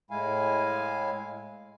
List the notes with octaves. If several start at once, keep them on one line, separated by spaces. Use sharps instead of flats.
A2 G#3 E4 F5 G#5